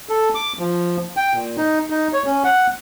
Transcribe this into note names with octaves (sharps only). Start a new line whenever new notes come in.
A4
D6
F3
G5
A#2
D#4
D#4
C#5
C#4
F#5